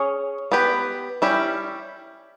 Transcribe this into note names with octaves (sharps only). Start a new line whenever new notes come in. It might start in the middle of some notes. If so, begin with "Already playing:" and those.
Already playing: C#4 G#4 C#5
B3 G4 B4
G3 C#4 E4 G4